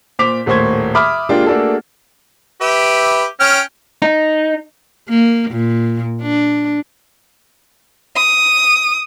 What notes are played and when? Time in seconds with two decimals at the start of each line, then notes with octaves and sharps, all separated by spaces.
0.19 A#2 C5 D6 B6 F7
0.46 D#1 A2 A#3 C5 C#6 G#6
0.95 E5 B5 D6 D#6 F6
1.29 G#3 A#3 D4 F4 G4
1.46 A3 A#3 D4 F#4 G#4 A4
2.61 G4 B4 E5
3.40 C#4 G5 F6
4.02 D#4
5.09 A#3
5.51 A#2
6.22 D4
8.15 D#6